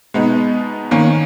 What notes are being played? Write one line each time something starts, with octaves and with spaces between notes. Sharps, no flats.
B2 G#3 B3 D#4
D#3 A#3 C#4